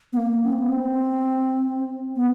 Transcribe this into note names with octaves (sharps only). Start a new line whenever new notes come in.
B3
A#3
C#4
C4
B3
C4
B3